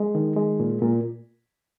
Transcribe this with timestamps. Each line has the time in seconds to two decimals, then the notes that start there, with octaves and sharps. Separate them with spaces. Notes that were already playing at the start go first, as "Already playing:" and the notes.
Already playing: G#3
0.15 D#3
0.36 G#3
0.60 A#2
0.82 A#2